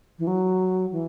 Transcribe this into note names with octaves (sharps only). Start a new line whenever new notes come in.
E3
F#3
E3